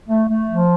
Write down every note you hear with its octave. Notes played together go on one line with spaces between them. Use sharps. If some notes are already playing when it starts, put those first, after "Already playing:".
A3
A3
F3